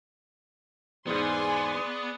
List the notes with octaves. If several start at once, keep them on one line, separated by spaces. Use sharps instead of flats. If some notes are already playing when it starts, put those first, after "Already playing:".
E2 G#2 B3 G#4 D5 G#5 C6